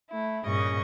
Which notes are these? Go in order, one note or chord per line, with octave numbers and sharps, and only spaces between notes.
A3 E4
G2 A#2 C#3 D#5 C#6